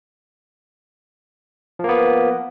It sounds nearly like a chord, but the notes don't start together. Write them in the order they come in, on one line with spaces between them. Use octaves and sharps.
F3 A#3 B3